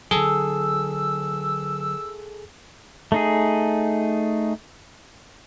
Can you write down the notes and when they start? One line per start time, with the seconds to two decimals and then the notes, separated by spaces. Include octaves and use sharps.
0.11 D3 F#3 G#4 A4 E6
3.12 A3 D#4 G#4